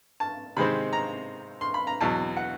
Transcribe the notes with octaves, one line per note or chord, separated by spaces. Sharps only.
A5
C3 D#3 G#3 C4 B5
A#5
C6
B5
A#5
E2 B2 F#3 A5
F#5